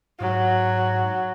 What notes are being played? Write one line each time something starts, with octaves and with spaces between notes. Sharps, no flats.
G#2 F#3